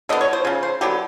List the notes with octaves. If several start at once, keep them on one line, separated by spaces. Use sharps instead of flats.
D3 G3 B3 D#5
C#5
C5
C#3 F3
C5
D3 F#3 B3 G4